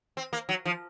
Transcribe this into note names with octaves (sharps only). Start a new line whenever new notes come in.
C4
A#3
F#3
F3